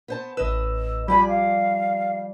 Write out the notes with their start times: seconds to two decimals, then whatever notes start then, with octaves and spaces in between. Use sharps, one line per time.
0.08 B3 C5 A5
0.37 A1 B4 D#5 E6
1.08 F3 G3 D5 G#5 B5
1.29 F5